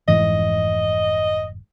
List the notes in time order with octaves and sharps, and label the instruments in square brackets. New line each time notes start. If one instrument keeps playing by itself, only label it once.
[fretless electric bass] F1 G#2 E3 [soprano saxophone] D#5